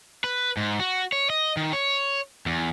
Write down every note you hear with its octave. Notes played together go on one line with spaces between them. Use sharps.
B4
G#2
F#4
C#5
D#5
D#3
C#5
E2